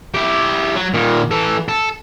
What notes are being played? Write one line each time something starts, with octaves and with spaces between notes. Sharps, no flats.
E4 G4
F#3
A#2 D#3
E3 A4
A4